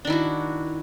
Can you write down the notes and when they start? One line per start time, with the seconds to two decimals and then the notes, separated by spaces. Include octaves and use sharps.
0.05 D4
0.07 D#3
0.10 E4
0.12 F#4